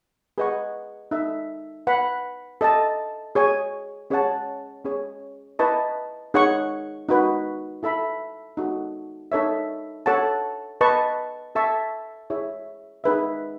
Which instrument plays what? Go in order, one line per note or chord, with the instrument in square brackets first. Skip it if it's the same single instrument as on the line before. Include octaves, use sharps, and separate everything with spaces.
[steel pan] G#4 B4 D#5 F#5 C#6
D#4 A4 E5
B4 F#5 B5
A4 D#5 A5
G#4 C#5 G#5
C#4 G#4 C#5 F#5 A5
C#4 G#4 C#5
E4 B4 D#5 A5 C#6
D#4 G#4 C#5 F#5 C#6
D#4 F#4 B4
E4 A4 E5 B5
D#4 F#4 A4
D#4 A4 C#5 E5
A4 C#5 F#5 A5
B4 D#5 A5 C#6
A4 E5 A5 C#6
E4 G#4 C#5 E5
D#4 G#4 B4 E5